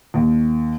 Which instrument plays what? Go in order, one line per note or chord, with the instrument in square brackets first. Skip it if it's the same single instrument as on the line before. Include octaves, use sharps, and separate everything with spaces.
[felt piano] D#2